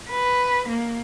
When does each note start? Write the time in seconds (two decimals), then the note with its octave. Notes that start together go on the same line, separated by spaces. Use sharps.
0.10 B4
0.69 A#3